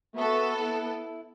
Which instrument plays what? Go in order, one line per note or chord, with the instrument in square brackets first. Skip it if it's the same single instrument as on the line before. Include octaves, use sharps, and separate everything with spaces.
[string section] B3 A4 [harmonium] F#4 E5
[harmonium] E4